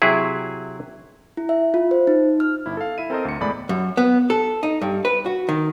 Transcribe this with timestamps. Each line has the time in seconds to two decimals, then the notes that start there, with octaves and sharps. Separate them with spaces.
0.02 C3 F#3 E4 G#4
1.37 E4
1.49 E5
1.74 F4
1.91 C5
2.07 D#4
2.40 F6
2.66 G1 E4
2.77 A4 F5
2.98 E4 E5 D#7
3.10 C4 A4 A#4 C5 D#5
3.25 D2 C#7
3.40 E2 A2 G#3 D5 B5
3.69 F#2
3.97 B3
4.30 A4
4.63 D#4
4.82 G2
5.05 B4
5.26 F#4
5.49 D#3